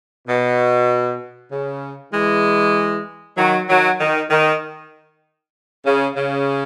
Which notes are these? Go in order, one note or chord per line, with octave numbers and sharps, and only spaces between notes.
B2
C#3
E3 G#3
D#3 F#3
D#3 F#3
D#3
D#3
C#3
C#3